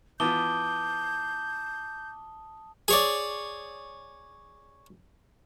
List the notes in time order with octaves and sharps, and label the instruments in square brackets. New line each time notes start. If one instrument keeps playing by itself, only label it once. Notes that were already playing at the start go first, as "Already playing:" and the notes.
[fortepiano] E3 B3 F4 [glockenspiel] A5 D#6 G7 [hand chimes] D6 [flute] G6
[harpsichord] G#4 C#5 D5